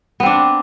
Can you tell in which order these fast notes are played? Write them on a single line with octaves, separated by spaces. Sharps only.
B3 C4 D4